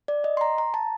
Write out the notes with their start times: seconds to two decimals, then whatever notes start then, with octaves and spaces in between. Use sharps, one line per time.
0.08 D5
0.24 D#5
0.37 C6
0.41 A#5
0.58 A#5
0.74 A5